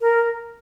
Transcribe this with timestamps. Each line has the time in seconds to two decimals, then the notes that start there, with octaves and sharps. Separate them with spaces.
0.01 A#4